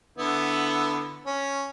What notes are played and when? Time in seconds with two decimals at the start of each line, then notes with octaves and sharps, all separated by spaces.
0.18 D3 B3 E4
1.26 C#4